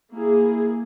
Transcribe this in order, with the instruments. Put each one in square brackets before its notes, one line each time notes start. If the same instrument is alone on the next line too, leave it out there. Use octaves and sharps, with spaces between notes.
[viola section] A#3 E4 G#4